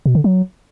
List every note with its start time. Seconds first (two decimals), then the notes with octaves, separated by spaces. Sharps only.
0.06 B2
0.15 D3
0.24 F#3